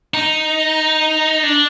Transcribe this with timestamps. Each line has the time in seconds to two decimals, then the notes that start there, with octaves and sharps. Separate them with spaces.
0.14 D#4
1.43 D4